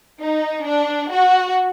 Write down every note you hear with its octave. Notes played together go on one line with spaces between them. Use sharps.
D#4
D4
F#4